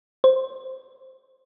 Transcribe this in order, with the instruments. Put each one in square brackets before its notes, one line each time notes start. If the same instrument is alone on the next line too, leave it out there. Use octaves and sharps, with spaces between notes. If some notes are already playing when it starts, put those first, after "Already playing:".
[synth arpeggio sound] C5